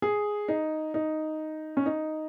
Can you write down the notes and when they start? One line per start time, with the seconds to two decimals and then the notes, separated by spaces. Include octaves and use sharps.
0.02 G#4
0.48 D#4
0.94 D#4
1.77 C#4
1.86 D#4